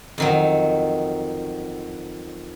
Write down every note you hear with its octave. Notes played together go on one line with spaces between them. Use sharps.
F2 D#3 F#3